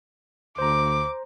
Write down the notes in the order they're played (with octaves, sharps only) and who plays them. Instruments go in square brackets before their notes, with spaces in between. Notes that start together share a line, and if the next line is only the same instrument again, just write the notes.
[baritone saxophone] D2 [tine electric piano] C5 A#5 [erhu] D6